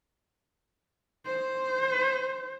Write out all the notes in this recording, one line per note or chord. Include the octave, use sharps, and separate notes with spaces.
C5